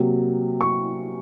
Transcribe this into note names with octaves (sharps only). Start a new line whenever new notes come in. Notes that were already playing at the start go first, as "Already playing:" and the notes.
Already playing: C3 F#3 A#3
C#6